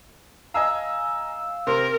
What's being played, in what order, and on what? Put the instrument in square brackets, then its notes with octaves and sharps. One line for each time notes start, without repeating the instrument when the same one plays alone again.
[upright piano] D#5 G#5 A#5 [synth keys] F5 E6
[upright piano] C3 C6 [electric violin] A#4